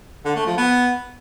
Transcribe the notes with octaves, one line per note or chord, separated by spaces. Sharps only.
D3
A3
F3
B3